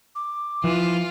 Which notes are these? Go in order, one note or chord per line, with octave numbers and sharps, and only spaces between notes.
D6
E3 F3 F4